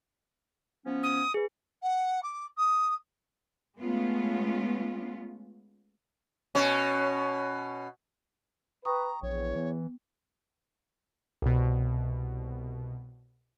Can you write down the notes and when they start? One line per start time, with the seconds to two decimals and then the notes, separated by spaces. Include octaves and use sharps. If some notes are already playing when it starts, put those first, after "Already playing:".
0.85 F3 B3 C#4
1.03 D#6
1.34 G#4 B4
1.82 F#5
2.23 D6
2.57 D#6
3.78 G#3 A3 B3 C#4 F4
6.55 B2 C#4
8.85 B4 G5 A#5 C#6 D#6
9.23 A#1 E2 C#5
9.55 E3 B3
11.42 C2 B2